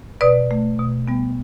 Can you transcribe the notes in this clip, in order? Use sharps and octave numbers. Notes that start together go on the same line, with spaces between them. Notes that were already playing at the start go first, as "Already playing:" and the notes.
B2 B4 D5
A3
B2
G3 B3